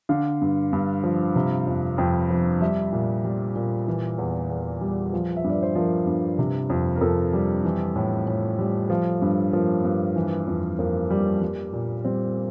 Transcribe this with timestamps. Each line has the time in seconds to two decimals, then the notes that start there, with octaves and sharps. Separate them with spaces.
0.09 D3 F5
0.41 G2
0.73 G2
1.04 F3
1.36 C3
1.67 F2
1.98 F2 G5
2.30 F3
2.61 G3 E5
2.93 A#2
3.24 G3
3.56 A#2
3.87 E3
4.18 E2
4.50 E2
4.81 G3
5.13 F3
5.36 E5
5.44 G2
5.49 D5
5.62 C5
5.75 F3 A#4
6.07 G2
6.38 C3
6.70 F2
6.96 A#4
7.01 F2 A4
7.33 G3
7.64 E3
7.96 A2
8.27 A2
8.59 G3
8.90 F3
9.22 G2
9.53 F3 A#3
9.84 G2
10.16 E3
10.47 F2
10.79 F2 A#3
11.10 G3
11.42 G3
11.73 A#2
12.05 G3 C4